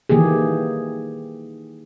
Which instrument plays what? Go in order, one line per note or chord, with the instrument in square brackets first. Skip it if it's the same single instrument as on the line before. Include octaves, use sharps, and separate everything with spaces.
[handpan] D#3 E3 A#3 G4 G#4